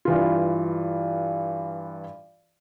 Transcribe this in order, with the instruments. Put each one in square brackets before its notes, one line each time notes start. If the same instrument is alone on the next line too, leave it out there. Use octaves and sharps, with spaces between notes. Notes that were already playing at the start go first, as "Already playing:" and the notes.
[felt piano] G2 E3 F4